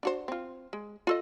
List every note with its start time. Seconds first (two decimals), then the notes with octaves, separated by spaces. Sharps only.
0.03 D4 F#4 C5
0.28 C4 F4
0.73 G#3
1.07 F4 A4 D#5